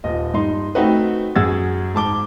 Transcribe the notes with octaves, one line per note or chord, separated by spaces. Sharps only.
D#1 F4 D#5
G2 D#4 C6
A3 C4 D#4 F#4 B4
F#2 G#4 F#5 E6 G#6 A6
G#2 A5 D6 G7